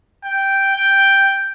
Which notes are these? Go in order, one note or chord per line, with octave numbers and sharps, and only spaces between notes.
G5
G5